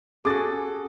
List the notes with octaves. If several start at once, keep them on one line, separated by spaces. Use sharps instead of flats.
C#4 F#4 G#4 A4 D6 A6